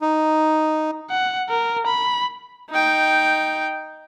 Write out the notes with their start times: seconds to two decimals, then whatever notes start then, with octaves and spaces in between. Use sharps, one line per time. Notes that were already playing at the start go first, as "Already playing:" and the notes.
0.02 D#4
1.10 F#5
1.49 A#4
1.87 B5
2.70 D#4 G5